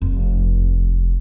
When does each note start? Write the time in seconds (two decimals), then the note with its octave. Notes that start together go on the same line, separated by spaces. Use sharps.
0.02 F1